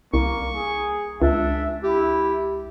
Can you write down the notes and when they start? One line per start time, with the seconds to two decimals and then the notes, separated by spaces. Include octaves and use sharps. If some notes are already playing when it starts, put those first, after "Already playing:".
0.14 C2 A#3 C#6
0.55 G#4
1.22 C#2 D4 E5
1.83 E4 G4